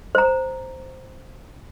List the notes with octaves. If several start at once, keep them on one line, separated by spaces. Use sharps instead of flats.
C5 A#5